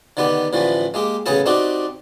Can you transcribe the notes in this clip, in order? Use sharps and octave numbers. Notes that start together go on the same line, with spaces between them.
D3 D#3 B3 G4
A1 D3 E3 F3 A3
G#3 A#3 G4
A1 C#3 B3 G#4 A4 A5
C4 D4 D#4 F#4 G4